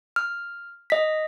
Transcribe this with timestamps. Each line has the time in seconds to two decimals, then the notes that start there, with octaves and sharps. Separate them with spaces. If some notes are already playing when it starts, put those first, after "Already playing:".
0.16 F6
0.90 D#5 B6